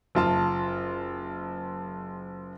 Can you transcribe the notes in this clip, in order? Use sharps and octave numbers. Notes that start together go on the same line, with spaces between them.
F#1 F4 A5